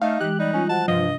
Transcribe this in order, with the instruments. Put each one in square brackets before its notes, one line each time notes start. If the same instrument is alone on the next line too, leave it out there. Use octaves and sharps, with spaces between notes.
[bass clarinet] A3 [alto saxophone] D#4 [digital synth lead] F5
[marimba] E3 G#3 [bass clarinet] G4 [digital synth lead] F#6
[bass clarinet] G3 [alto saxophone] D#4
[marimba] G3 F4 D#5 [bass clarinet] C#4
[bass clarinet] F3 [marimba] F#4 F#5 [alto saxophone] A5
[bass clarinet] G2 [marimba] C3 D4 [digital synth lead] F3 [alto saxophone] D#5